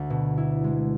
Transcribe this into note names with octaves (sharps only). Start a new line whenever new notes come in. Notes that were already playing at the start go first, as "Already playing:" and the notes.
Already playing: D2
B2
E4
G#3